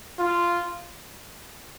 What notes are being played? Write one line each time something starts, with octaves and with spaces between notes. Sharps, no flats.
F4